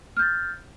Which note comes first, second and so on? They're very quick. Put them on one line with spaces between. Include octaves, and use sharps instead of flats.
F6 G6 A6